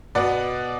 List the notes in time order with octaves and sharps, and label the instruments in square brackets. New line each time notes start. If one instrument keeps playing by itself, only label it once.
[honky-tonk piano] B2 B3 D5 F#5